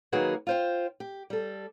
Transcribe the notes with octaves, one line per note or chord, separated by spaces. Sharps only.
D#3 F#3 A#3 F#4 G#4 B4
F4 C5 G5
G4
G3 A4